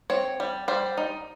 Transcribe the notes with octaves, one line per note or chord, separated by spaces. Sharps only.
C4 C#5
G3
G3 C5
D#4